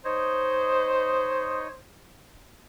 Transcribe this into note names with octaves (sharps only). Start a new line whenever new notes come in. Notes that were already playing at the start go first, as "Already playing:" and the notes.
D#4 C5 C#5 D#5